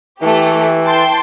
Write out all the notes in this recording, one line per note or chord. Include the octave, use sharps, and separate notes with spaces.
E3 A3 G4
G5 A5 C6